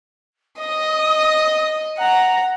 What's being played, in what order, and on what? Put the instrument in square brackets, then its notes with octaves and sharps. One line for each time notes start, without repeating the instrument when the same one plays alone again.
[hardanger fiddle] D#5 [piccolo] D#6
[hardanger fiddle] F#5 [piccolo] A#5